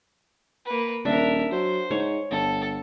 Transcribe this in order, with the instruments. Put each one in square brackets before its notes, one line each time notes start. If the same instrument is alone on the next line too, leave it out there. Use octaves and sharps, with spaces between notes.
[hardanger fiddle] A#3 B4
[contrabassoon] D#1 [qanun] D4 [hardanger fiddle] A#4 E5
[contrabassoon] F#3 [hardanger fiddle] C5
[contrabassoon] G#2 [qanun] C#5
[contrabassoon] G1 [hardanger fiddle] A4